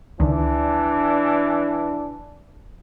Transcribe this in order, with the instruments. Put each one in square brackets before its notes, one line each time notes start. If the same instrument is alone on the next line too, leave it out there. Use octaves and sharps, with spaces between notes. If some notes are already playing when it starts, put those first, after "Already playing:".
[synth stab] C#2 D#3 [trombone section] E3 D4